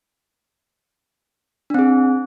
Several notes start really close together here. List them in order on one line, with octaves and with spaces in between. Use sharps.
D4 C4 G#4